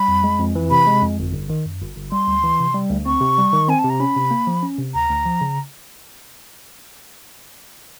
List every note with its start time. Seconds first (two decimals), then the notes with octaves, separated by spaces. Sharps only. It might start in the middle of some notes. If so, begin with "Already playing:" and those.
Already playing: G3 B5
0.08 F2
0.24 G#3
0.39 F2
0.55 E3
0.70 C3 B5
0.87 G#3
1.02 F2
1.19 G1
1.34 G1
1.50 D#3
1.66 F#2
1.81 G1
1.96 G1
2.12 G3 C6
2.27 D2
2.43 E3
2.60 C3
2.74 G3
2.90 D2
3.06 C4 C#6
3.21 C3
3.38 G3
3.53 D#3
3.68 C4 G#5
3.79 A5
3.84 C3
3.90 A#5
4.00 C#4 B5
4.16 C3
4.31 A#3
4.47 F3
4.63 C#4
4.78 C3
4.94 D2 A#5
5.09 D2
5.26 F3
5.41 C#3